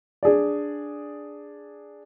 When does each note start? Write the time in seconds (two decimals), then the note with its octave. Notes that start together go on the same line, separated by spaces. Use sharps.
0.23 D4 G#4 D5